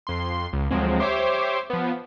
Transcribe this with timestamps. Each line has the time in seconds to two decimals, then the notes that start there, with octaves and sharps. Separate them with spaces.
0.07 F2 C6
0.53 C#2
0.71 D2 F3 F#3 G#3 C4
0.99 G4 C5 C#5 E5 C6 D6
1.70 F3 B3